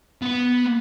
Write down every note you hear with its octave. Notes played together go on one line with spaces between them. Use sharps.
B3 B5